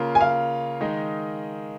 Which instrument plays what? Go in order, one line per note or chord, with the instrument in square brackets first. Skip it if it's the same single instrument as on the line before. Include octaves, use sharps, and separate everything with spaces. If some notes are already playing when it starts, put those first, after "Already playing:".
Already playing: [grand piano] C#3 A#3 F4
[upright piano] G#5
F5
[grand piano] D#3 G#3 D#4